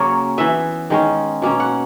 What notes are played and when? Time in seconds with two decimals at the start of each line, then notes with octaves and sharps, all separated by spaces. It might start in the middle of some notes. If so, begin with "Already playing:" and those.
Already playing: C#3 F#3 A#3 C#4 C#5
0.38 E3 B3 E5
0.90 D#3 G#3 C#4
1.42 B2 A#3 C#4
1.60 F#5